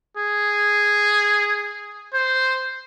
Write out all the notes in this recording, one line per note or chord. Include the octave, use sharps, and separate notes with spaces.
G#4
C5